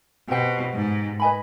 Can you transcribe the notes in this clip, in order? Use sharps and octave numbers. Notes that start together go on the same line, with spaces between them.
B2 G4 C5 G5
G#2
B4 D#5 G#5 B5